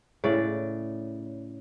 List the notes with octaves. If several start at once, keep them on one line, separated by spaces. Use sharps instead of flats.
A2 C#3 D5